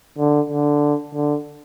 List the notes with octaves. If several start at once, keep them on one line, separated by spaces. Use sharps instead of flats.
D3
D3
D3